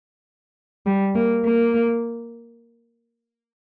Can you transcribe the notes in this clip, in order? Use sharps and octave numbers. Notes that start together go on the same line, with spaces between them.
G3
A#3
A#3